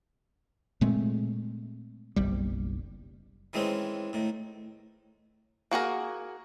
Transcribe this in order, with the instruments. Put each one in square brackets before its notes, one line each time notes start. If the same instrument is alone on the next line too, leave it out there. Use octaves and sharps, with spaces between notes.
[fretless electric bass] A#2 G#3 A3 C4
F#1 B1 G3
[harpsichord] D#3 E3 G#3 C4 C#4
A2 D#3
[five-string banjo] A#3 F#4 G#4 A#4